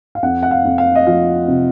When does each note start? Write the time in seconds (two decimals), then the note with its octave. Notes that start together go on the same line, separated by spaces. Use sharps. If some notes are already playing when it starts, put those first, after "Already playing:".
0.15 F5
0.23 F2 F#5
0.43 F#5
0.51 F5
0.65 F2
0.78 F5
0.95 D#5
1.07 F3 F5
1.48 C3